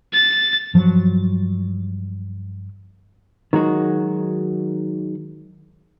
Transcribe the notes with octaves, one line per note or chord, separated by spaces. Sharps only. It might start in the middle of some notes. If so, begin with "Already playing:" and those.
A6
G2 F3 F#3
D#3 F#3 G#3 F#4